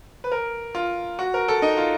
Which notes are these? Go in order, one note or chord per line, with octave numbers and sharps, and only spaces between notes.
B4
A#4
F4
F#4
A#4
A4
D#4
F4